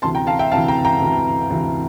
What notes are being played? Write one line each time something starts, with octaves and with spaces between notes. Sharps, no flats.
D2 C3 E3 A5 C6
G5 A#5
F5 A5
E5 G5
D2 C3 E3 F5 A5
G5 A#5
G5 A#5
D2 C3 E3
D2 C3 E3